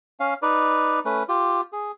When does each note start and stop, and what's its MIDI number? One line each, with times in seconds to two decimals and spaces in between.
0.20 0.34 61
0.20 0.34 77
0.42 1.00 63
0.42 1.00 71
0.42 1.00 74
1.05 1.23 57
1.05 1.23 61
1.05 1.23 71
1.29 1.61 65
1.29 1.61 67
1.72 1.92 68